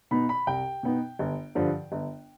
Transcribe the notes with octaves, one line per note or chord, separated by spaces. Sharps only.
B2 B3 D#4 B5
B5
C2 G5
B2 B3 D#4
G1
G2 D3 F3
G1